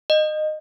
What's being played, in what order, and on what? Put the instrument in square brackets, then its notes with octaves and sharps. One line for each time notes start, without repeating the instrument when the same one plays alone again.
[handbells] D#5